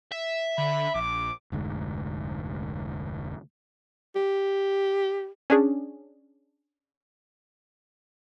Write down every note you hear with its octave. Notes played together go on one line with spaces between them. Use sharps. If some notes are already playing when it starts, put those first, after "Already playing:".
E5
D3 B5
A#1 D6
F1 D2 G#2
G4
C#4 D4 G#4